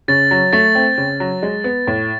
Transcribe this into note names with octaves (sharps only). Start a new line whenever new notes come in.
C#3 A6
F#3
A3 A6
C4
C#3
F#3
G#3
B3
A2